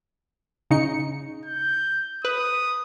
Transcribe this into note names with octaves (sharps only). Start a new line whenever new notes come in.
C#3 D#4 C#7
G6
B4 D#6